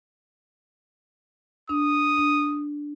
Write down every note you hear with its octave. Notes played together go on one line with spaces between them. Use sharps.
D4 D#6
D4